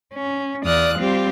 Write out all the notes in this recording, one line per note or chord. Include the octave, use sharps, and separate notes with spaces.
C#4
E2 D5 F5 D#6 F#6
G3 C4 F4 G4